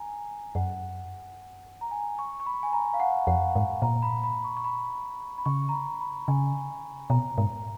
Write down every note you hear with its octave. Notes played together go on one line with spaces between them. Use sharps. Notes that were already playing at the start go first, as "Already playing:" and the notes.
Already playing: G#5 A#5
F#2 F#5
A#5
G#5
C#6
C#6
B5
G#5
A#5
F5
F#5
F2 F#5
G#2
A#2 A#5
B5
B5
C#6
C#6
B5
B5
C#3 C#6
A#5
B5
B5
C#3 G#5
B2 A#5
G#2 A#5